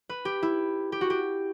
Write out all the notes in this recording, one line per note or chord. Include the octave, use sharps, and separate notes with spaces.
B4
G4
E4
G4
F#4
G4